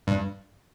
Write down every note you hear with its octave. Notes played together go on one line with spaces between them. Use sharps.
G2